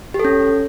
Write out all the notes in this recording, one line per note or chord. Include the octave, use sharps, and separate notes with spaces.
G4
A4
C#4